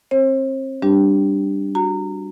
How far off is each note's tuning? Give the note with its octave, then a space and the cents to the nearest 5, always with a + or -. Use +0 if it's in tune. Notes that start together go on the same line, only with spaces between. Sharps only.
C4 +25 C5 +40
G3 +0 D4 +0 G4 +0
F#4 -15 A#5 -25